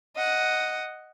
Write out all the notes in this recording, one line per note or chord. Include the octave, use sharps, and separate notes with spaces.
D#5 F#5